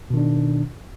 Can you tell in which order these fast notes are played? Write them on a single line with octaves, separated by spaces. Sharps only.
B2 D#3 D4